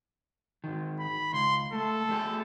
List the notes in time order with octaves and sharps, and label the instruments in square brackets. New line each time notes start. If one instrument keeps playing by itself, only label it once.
[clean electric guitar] G#2 D#3
[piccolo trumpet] B5
[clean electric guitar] C#2 [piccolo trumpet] C6
[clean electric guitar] A3 [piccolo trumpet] A4
[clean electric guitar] A3 G4 G#4